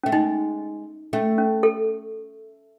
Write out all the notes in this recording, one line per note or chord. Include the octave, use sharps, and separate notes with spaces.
A3 C#4
G#3 D#4
A3 C#4
C#4
A4